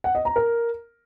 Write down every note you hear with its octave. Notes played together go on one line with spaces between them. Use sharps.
F#5
D#5
A#5
A#4